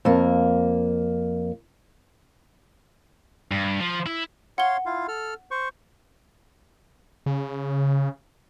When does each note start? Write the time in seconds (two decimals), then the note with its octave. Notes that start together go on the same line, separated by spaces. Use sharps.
0.05 F2 A#3
3.51 G2
3.80 F3
4.06 E4
4.58 C#5 F5 F#5 C6 G7
4.86 E4 F4 F5
5.08 A4 F6
5.51 C5 C#6
7.26 C#3